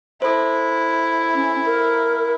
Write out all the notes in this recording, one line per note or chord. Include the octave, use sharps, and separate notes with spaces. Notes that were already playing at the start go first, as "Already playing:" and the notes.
E4 A4 C5
C#4
A#4